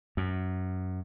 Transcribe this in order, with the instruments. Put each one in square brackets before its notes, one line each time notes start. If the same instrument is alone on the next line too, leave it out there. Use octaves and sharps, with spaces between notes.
[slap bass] F#2